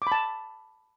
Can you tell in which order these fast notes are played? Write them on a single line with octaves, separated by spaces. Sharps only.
D6 B5 A5